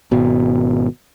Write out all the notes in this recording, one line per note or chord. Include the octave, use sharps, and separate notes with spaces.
G#1 B2